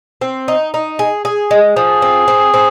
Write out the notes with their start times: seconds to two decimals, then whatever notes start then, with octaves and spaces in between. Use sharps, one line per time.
0.21 C4
0.48 D#4
0.74 D#4
0.99 G#4
1.25 G#4
1.51 G#3
1.76 F3 G#4
2.02 C4
2.28 C4
2.54 C4